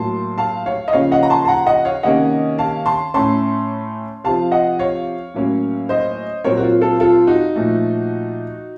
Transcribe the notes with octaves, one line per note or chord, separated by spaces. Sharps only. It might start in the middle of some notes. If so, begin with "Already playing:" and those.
Already playing: A2 F#3 A#3 A5 C6
F5 A5
C#5 F5
D#5
C#3 F3 A#3 C#4 C#5 F5
D#5 F#5
A#5
A5 C6
A5
F#5 A#5
D#5 F#5
C#5 F5
C3 D#3 A#3 C#4 D#5 F#5
F5 A5
A5 C6
A2 A3 C#4 A5 C6
C3 F3 C4 F5 A5
D#5 F#5
C#5 F5
A2 F#3 A#3 C#4
C5 D#5
A#2 F#3 C4 A#4 C#5
F#4
F4
F4 A4
F4 A4
D#4 F#4
A#2 F3 A3